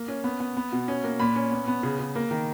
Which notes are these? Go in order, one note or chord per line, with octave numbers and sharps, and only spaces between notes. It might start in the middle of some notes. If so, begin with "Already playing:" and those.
Already playing: A#3
C#4
B3
B3
B3
B2
C#4
A#3
A#2 B5
C#4
B3
B3
C#3
C#3
A#3
D#3